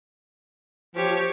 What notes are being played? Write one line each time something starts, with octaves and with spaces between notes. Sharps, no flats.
F3 G4 C#5